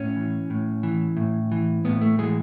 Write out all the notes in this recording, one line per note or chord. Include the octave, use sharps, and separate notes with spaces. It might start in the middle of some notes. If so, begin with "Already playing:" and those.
Already playing: A2 C#4
E3
A2
E3
A2
E3
A2 B3
A3
E3 G#3